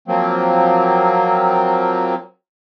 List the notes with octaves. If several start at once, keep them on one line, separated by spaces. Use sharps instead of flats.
F3 F#3 A#3 C4